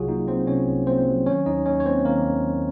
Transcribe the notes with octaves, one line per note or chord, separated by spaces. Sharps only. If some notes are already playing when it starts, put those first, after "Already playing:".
Already playing: C2 C3 F#3 F4 F#4 G#4
A#3 D#4
F#3 C4 C5
C3 C#4 C#5
C2
A#3 C4 C5
F#3
D#3 C#4 C#5
D#2 D#4 D#5
D#2 C#4 C#5
C#5
A#3 C4 C5
D#3 A#3 A#4
D#2
D#2